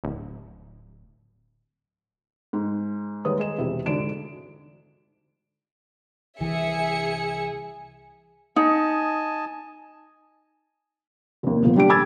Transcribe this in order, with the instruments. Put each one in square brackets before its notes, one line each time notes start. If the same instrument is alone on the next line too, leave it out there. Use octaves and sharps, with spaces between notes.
[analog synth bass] D1
[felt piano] G#2
D#2 G3 G#3 B4 C#5 D#6
G#4 D#5 E7
E1 C3 E4 G4
D2 G#2 D3 D4 D7 E7
[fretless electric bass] C2 E3 [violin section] G#4 E5 C#7
[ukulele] D#4 [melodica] D#5 G#5 A5
[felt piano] F1 D#2
D#1 F3 B3
G3 D4 G4 D7
G#5 B5 D6 E6 G#6 A6